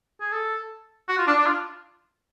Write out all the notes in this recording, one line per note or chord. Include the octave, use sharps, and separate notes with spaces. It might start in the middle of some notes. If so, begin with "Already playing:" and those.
G#4
A4
F#4
F4
D4
D4
F4